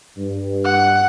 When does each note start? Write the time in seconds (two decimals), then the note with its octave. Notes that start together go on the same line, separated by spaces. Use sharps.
0.17 G2
0.64 F#5